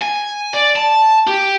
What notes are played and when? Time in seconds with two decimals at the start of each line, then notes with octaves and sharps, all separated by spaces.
0.01 G#5
0.54 D5
0.76 A5
1.27 G4